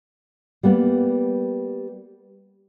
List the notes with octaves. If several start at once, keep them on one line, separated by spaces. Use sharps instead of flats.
G3 A#3 B3